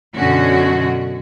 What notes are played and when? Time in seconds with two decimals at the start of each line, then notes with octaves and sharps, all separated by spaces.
0.16 F#2 B2 D3 C#4 F#4